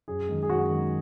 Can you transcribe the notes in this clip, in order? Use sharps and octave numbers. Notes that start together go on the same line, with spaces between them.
F#2 G#4
D#3 G#3
G#4
F#2 F#4
D#3 G#3